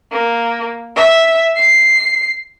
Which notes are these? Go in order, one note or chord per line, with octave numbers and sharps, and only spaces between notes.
A#3
E5
C7